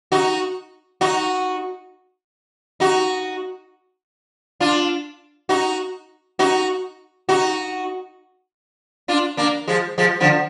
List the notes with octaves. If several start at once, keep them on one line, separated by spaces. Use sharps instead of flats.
D#4 F#4
D#4 F#4
D#4 F#4
D4 F4
D#4 F#4
D#4 F#4
D#4 F#4
D4 F4
A#3 D4
F3 G#3
F3 G#3
D3 F3